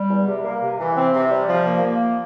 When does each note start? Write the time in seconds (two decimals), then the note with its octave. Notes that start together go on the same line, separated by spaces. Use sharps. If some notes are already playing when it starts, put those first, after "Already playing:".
Already playing: G3
0.10 E2
0.27 C3
0.44 A#3
0.61 C3
0.79 E3
0.96 C4
1.14 C3
1.31 G3
1.48 F3
1.66 A#3
1.83 A#3